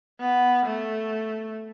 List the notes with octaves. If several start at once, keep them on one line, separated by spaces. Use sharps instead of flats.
B3
A3